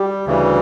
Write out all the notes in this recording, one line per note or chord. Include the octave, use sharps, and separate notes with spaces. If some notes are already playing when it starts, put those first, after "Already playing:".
Already playing: G3 G4
D2 C#3 E3 G3